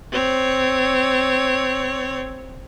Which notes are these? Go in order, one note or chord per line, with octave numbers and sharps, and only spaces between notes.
C4 C#5